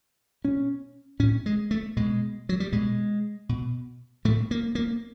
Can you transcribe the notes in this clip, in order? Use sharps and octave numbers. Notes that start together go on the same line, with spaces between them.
B2 C#4
A2 C#4
G#3
A3
B2 G#3
F#3
G3
B2 G#3
B2
A2 A3
A#3
A#3